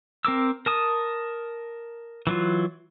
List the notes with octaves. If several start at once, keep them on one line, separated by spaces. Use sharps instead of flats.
C4 A#4 D6 E6
A#4 A5 D#6
E3 F#3 F4